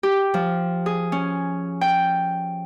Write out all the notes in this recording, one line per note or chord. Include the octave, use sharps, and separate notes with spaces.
G4
F3
G#4
C#4
G5